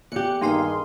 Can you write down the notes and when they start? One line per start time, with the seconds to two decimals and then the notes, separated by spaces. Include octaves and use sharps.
0.12 E2 G4 F#6 C#7
0.41 G2 D#3 A#3 D#4 G#4 F5 C6